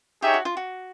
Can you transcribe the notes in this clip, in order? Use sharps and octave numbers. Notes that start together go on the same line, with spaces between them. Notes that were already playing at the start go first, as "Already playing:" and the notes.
D#4 G4 G#4 C#5 E5 G5
F#4
F4
F#4